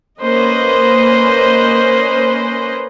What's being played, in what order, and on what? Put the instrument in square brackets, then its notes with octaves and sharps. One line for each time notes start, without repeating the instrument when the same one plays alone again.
[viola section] A#3 C#4 B4 C5 D#5